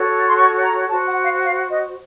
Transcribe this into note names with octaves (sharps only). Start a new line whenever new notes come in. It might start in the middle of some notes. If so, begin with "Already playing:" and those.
Already playing: F#4 A4 C#5
C6
C#6
A#5
F#4 C5 A5
F#5
F5
F5
D#5